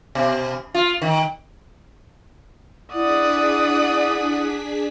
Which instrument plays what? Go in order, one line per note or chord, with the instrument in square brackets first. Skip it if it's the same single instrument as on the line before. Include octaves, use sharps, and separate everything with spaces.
[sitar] B2
F4
D#3
[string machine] D4 G#4 B6 [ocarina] E4 [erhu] D5 [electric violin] F#5 D#6